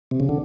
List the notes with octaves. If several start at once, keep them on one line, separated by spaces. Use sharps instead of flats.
C3
C#3
D3